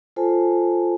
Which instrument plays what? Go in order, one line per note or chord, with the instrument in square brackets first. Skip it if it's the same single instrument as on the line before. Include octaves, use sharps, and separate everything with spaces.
[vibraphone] F4 A4 C5 G#5 A5